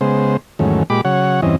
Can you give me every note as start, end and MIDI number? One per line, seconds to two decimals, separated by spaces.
0.01 0.37 49
0.01 0.37 56
0.01 0.37 59
0.01 0.37 72
0.59 0.83 40
0.59 0.83 44
0.59 0.83 51
0.59 0.83 54
0.59 0.83 57
0.59 0.83 61
0.90 1.01 46
0.90 1.01 56
0.90 1.01 67
0.90 1.01 83
0.90 1.01 86
1.05 1.41 49
1.05 1.41 54
1.05 1.41 73
1.05 1.41 78
1.42 1.56 40
1.42 1.56 43
1.42 1.56 52
1.42 1.56 60
1.42 1.56 61
1.42 1.56 75